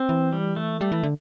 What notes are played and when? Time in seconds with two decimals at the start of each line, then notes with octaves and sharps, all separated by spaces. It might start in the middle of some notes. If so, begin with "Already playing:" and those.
Already playing: C4
0.09 E3
0.33 G3
0.56 A3
0.81 G3 A3
0.92 E3
1.03 D3